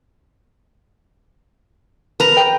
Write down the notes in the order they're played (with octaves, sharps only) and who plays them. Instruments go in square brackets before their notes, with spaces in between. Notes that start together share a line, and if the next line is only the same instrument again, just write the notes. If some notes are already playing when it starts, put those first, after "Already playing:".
[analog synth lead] A#4 [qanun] B4 A#5
[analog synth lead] G5